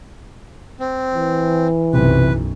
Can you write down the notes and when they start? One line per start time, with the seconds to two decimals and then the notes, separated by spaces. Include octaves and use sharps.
0.80 C4
1.14 E3
1.93 B1 F#2 C3 B4